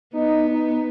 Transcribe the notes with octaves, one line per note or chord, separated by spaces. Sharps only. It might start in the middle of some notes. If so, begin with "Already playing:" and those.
B3 D#4
D#4